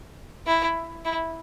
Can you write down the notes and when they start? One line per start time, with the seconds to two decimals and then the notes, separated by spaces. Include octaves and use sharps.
0.47 E4
1.05 E4